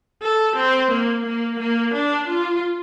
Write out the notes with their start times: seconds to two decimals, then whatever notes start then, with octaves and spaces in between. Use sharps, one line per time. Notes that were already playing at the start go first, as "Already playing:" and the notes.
0.23 A4
0.57 C4
0.92 A#3
1.26 A#3
1.60 A#3
1.94 D4
2.28 F4